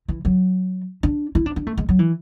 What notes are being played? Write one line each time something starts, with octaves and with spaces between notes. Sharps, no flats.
E3
F#3
D4
E4
D4
D4
A3
G#3
F#3
E3